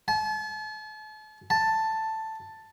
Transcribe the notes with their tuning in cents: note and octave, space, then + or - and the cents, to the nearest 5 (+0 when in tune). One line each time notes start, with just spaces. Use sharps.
A5 -40
A5 +5